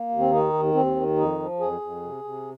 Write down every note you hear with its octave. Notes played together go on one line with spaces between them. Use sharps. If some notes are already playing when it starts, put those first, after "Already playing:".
Already playing: A#3
D#2
C4
D#3 D#4
D#2
D#2 C4
D#3
F2 D#4
F3
F2 G#4
F2
C3
C3